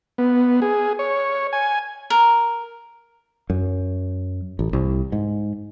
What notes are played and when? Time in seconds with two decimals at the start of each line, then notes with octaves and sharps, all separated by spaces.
0.18 B3
0.62 G#4
0.99 C#5
1.53 G#5
2.10 A#4
3.50 F#2
4.59 A1
4.73 C2
5.12 G#2